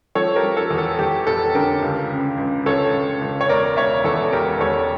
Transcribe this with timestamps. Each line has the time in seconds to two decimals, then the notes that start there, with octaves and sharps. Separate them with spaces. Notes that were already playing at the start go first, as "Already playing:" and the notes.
0.15 F3 A4 C#5
0.36 G4 A#4
0.43 F3
0.57 A4
0.71 E2
0.78 A4
0.99 E2 G4
1.27 F1 A4
1.54 D3 G4 A#4
1.82 C#2
2.10 C#3
2.38 C#2
2.66 C#2 A4 C#5
2.94 C#2
3.21 C#2
3.41 C#5
3.49 E1 A#4 D5
3.77 E1 C#5 E5
4.04 E2 A4 C#5
4.32 E1 G4 A#4
4.60 E2 A4 C#5